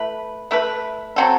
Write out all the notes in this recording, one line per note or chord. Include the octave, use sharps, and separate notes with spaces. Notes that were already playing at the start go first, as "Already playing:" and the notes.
Already playing: A3 E4 B4
A3 E4 B4
F#3 C4 F#4 A4